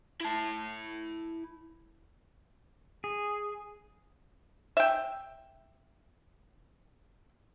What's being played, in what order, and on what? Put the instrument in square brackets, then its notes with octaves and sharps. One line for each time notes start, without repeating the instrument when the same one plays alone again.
[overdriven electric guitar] E4 A5
[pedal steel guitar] G#4
[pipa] E5 G5